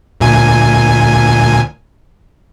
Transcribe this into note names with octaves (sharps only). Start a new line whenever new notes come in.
D2 A#2 G#5